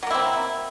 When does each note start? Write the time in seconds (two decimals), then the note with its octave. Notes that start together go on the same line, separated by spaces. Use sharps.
0.03 F#3
0.07 A#3
0.10 E4
0.14 C4